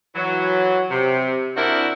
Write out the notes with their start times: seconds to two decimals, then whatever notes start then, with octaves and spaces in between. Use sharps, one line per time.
0.15 E3 F#3
0.90 C3
1.55 C4 D4 E4 F#4 A#4